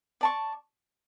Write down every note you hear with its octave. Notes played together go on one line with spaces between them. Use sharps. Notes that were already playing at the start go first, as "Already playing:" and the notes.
D5 A5 C#6